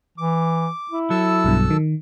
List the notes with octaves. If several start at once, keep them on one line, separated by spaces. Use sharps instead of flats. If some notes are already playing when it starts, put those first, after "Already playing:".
E3 D6
E4
F#3 A4 A5 E6
B1 G2 B2
D#3